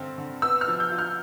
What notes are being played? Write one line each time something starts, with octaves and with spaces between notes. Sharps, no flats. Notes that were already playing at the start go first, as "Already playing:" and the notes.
Already playing: G2 D3 C4
D3
B3 E6
F6
F3
G6
F4
F6